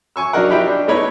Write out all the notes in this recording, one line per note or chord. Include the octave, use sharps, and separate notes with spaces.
G#5 C#6 E6
F#3 D4 D#4 A#4 F#5
D#4 F4 G4 E5 G5 B5
D4
A3 B3 D#4 E4 B4 C#5